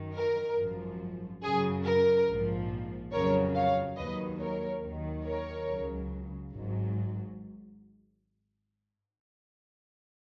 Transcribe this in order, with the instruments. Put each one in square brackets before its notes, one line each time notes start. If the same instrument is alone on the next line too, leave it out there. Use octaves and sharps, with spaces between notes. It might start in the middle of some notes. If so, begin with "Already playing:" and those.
Already playing: [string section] F#2 D#3 F#3
A#4
G#1 F#2 F3
F#2 C#3 F#3 G#4
A#4
A#1 G#2 F3
F2 C#3 F#3 A#4 C#5
C#5 F5
D#2 D#3 F#3 B4 D#5
A#4 C#5
D#2 D#3 F#3
A#4 C#5
C#2 C#3 F#3
G#1 G#2 F#3